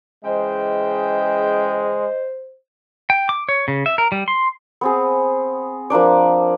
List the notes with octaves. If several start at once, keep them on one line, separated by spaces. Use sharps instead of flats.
C#3 E3 G#3 C5 D#5 G5
G5
D6
C#5
C#3
E5
A#4
G3
C6
B3 C4 G#4
F3 A#3 D4 D5